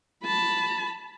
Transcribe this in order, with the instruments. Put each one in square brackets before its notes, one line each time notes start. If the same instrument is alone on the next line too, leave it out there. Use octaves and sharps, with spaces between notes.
[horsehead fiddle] A5 B5